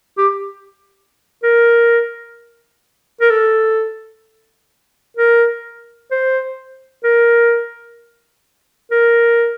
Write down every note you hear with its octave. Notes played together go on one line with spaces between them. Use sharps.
G4
A#4
A#4
A4
A#4
C5
A#4
A#4